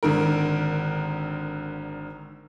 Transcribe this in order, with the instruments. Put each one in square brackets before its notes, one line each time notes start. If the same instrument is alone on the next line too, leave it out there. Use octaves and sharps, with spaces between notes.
[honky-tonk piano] G#1 D3 D#3 A#4